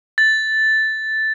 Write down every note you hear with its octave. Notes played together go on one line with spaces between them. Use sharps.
A6